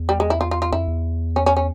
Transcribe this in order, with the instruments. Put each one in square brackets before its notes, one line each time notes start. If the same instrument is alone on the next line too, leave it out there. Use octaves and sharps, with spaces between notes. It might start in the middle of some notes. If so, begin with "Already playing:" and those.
Already playing: [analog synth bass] E2
[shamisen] G3
G#3
E4
F4
F4
F4
[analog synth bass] F2 [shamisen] E4
[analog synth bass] E2
[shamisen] C#4
C#4
C#4